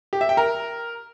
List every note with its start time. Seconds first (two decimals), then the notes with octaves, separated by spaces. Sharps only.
0.13 G4
0.21 E5
0.29 G5
0.37 A#4